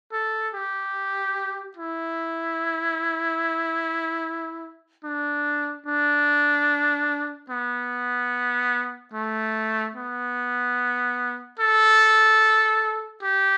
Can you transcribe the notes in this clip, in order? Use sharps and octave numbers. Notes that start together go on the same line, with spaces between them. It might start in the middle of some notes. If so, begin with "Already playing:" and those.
A4
G4
E4
D4
D4
B3
A3
B3
A4
G4